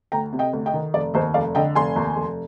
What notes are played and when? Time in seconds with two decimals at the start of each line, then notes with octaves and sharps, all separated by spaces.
0.12 D2 G5 A#5
0.33 C3
0.39 D#5 G5
0.53 D2
0.66 D#5 G5
0.73 D#3
0.94 F1 D5
1.14 D#2 C5 D#5
1.34 F1 D5 F5
1.55 D3 D#5 G5
1.75 F1 G#5 C6
1.96 D#2
2.16 F1